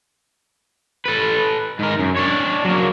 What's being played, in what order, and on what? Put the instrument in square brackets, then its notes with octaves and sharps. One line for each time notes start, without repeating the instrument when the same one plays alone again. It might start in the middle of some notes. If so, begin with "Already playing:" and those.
[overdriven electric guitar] A4 B4
G#2 A#4
F#2
D4 C#5
F#3 A#3